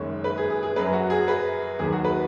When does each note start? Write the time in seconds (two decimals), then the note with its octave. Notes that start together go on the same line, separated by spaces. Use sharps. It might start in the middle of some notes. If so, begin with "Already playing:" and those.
Already playing: F#1 F#2 D#3 G#3 C#5
0.24 B4
0.38 G#4
0.50 G#4
0.63 G#4
0.76 F#2 F#3 B4
0.93 F#4
1.10 G#4
1.28 B4
1.79 D#2 D#3 F#3 G#4
1.92 F#4
2.04 B4